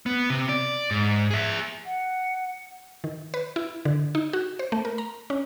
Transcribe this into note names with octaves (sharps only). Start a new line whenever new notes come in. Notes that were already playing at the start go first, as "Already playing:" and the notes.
B3
C3
D5
G#2
G#4 E5
F#5
D#3
B4
E4
D3
D#4
F#4
C5
A3
A#4
A#5
C#4